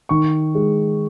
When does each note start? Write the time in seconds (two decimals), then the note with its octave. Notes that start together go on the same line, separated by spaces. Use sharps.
0.09 D#3 C#6
0.55 G#3